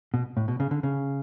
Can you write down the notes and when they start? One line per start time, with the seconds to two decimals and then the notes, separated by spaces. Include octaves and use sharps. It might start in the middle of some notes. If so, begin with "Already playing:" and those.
0.14 B2
0.37 A2
0.48 B2
0.60 C#3
0.71 D3
0.83 C#3